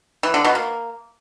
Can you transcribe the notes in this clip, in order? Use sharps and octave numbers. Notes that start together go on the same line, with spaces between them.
E3
D3
B2
A#3